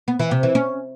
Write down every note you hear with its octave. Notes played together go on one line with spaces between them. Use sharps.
B3
E3
C3
E3
C#4